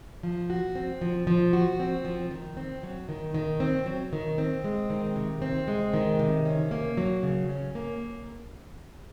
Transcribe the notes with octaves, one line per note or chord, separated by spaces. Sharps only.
F3
F#4
C4
F3
F3
F#4
C4
F3
D#3
C4
F#3
D#3
D#3
C4
F#3
D#3
C4
G#3
D#3
C3
C4
G#3
D#3
C3
C#4
A#3
F#3
C#3
C#4
A#3